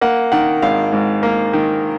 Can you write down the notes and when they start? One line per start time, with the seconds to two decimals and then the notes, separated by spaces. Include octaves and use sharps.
0.01 A#3 F#5
0.32 D#3 F#5
0.62 G#1 F5
0.93 G#2
1.23 A#3
1.53 D#3